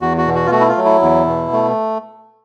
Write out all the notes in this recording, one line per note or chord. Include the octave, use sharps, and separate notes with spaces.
E2 F#4
F#4
B2
F#4
F4
A3 F#4
E4
F4
F#3
E4
E2
B2
A3